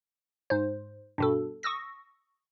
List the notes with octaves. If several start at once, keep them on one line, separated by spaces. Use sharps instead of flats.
G#2 C5
G2 B2 A4
C#6 D#6 E6 A#6